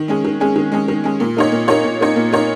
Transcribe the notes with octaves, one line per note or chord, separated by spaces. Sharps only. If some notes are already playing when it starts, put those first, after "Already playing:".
Already playing: D#3
G#3 C#4 G#4
D#3
G#3 C#4 G#4
D#3
G#3 C#4 G#4
D#3
G#3 C#4 G#4
A#2
A#3 D#4 C#5
A#2
A#3 D#4 C#5
A#2
A#3 D#4 C#5
A#2
A#3 D#4 C#5